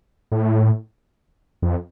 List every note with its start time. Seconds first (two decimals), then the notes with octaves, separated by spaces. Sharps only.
0.32 A2
1.62 F2